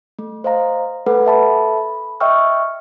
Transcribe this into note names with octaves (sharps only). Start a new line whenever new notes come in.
A3
C5 D#5 F5 A#5
A3 A4 B4 F#5
A4 E5 A5 B5
B5
D#5 E5 G5 C#6 E6 F6